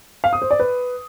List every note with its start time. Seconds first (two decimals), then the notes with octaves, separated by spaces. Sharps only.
0.24 F5
0.33 D#6
0.42 C5
0.51 D5
0.60 B4